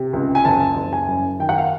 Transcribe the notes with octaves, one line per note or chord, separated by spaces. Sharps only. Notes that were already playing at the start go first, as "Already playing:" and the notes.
Already playing: C3
C#2
G#5
F#1 A5
F#1
G#5
F#2
D#3 G5
F#5
F5